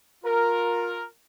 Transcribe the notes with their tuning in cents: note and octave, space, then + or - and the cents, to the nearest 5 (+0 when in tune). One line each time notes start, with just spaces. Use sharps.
F4 +25 A#4 +0